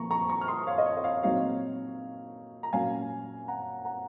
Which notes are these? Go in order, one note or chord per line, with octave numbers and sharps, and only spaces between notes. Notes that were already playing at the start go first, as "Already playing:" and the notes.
Already playing: A#2 F3 A#3 A#5 C#6
A#5 C#6
A#5 C#6
F6
C6 D#6
C#5 F5
D#5
C#5
D#5
C#5 F5
A#2 F#3 C4 D#4 C#5 F5
A#5
A#2 F#3 C#4 F5 G#5
F#5 A#5
F#5 A#5